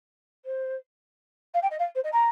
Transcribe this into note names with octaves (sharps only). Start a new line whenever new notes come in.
C5
F5
G5
D#5
F5
C5
D#5
A#5